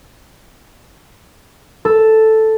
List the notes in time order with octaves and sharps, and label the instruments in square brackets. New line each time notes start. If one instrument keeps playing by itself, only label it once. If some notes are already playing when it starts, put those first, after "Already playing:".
[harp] A4